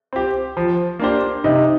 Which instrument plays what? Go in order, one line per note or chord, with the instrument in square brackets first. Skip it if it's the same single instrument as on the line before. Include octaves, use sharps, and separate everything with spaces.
[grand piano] C4 G4
F3
A#3 D4 G4 C5
[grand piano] C3 [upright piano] D#4